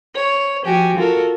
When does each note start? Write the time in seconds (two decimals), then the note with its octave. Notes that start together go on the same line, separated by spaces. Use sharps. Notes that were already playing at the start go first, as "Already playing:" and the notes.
0.15 C#5
0.64 F3 F#4 G4 G#5
0.96 F4 F#4 A4 A#4